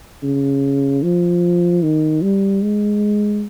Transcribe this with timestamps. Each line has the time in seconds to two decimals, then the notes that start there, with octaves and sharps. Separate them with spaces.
0.23 C#3
1.03 F3
1.83 D#3
2.22 G3
2.62 G#3